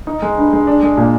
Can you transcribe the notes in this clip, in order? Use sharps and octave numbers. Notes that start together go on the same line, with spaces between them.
D#4
G#3
G2
G#3
D4
G#3
A#2